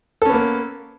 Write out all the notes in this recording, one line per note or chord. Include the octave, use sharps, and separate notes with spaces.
A#3 B3 C#4 A4